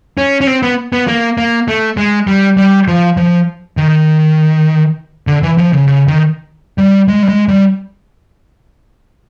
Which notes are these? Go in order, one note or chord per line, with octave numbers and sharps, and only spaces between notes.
C#4
C#4
C4
B3
B3
A#3
A#3
A3
G#3
G3
G3
F3
F3
D#3
D3
E3
F3
C#3
C#3
D#3
G3
G#3
G3
G#3
G3